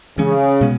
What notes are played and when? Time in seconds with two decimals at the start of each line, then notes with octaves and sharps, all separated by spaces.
0.18 C#3 E3 G#3 C#4
0.61 B2 G#3 B3